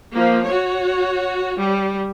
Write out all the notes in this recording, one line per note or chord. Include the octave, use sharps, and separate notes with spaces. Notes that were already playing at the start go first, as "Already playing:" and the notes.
F3 A#3
F#4 C#5
G3